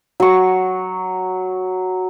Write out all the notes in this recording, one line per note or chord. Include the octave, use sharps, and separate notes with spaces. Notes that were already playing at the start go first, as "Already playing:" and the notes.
F#3 C#6